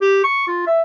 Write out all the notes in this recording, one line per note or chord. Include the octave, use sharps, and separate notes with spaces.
G4
C#6
F4
E5